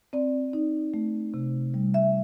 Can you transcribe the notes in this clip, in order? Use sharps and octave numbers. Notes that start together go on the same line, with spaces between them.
C4 D5
D#4
A3
C3
G3
E5